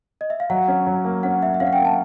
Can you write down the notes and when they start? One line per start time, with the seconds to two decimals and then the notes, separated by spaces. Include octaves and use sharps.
0.21 D#5
0.30 E5
0.40 F5
0.50 F#3 F#5
0.68 C#4
0.86 F#3
1.05 A#3
1.23 C#4 F#5
1.42 A#3 E5
1.54 E5
1.60 C#4 F5
1.66 F#5
1.73 G5
1.79 A#3
1.85 A5